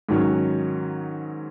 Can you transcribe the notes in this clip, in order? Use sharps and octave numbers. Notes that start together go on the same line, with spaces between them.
G#2 D#3 F#3 C#4